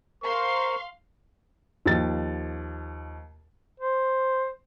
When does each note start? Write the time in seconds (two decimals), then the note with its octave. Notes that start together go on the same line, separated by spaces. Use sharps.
0.24 A#4 C5 F5 C6 C#6
1.86 D#2 F3 A6
3.80 C5